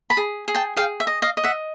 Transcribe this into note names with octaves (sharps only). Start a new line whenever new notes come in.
A5 B5
G#4
G#4
G5 A5
G#4 F5 G5
E5
D#5
D#5 F5
D#5
E5 F#5